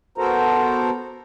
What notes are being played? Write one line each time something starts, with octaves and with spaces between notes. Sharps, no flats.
B3 F#4 A4 A#4 C5 A#5